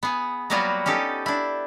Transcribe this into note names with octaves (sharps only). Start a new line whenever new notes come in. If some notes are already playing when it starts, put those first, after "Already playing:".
B3 G#4
F#3 G3 A#3 B3 F4 F#4
C#4 D#4 G4 A4
D4 E4